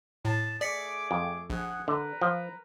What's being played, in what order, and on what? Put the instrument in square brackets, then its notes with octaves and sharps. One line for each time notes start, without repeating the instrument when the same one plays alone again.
[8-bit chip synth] A2 [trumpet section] A5
[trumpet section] A3 G#4 D6 [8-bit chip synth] D5 B6 C#7
[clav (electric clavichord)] F2
[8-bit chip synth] A#1 [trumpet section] G#4 F#5
[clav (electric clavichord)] D3 [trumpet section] A#4 B4 A#5
[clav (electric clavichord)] F3